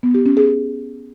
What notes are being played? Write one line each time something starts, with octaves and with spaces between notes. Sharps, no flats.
B3
G4
C#4
G#4